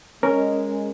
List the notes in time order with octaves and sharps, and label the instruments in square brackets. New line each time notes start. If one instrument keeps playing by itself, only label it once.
[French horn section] G#3 [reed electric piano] C#4 A#4